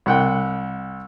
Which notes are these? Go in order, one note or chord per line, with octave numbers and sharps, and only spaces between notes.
C2 F#5 G5